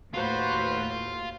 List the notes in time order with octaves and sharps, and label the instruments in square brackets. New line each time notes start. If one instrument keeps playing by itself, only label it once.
[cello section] D#2 A2 [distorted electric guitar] F4 [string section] F#4 B4 C5